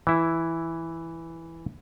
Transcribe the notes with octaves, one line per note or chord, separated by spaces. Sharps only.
E3 E4